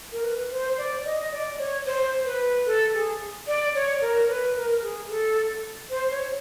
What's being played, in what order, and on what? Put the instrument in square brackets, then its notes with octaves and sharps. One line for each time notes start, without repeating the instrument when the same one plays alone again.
[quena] A#4
B4
C5
D5
D#5
D5
C#5
C5
B4
A4
G#4
D5
C#5
A#4
B4
A#4
G#4
A4
C5
C#5